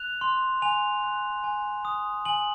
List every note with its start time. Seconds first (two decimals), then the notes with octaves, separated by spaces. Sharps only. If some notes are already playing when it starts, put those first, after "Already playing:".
Already playing: F#6 F7
0.21 C6
0.62 G#5 F7
1.04 F#6
1.44 G#5
1.85 D#6
2.25 G#5 F#7